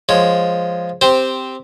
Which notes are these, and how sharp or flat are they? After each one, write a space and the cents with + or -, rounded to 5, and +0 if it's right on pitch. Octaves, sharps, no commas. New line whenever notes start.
F3 +0 G#3 +0 C#5 +0
C4 -5 G4 +0 C5 +0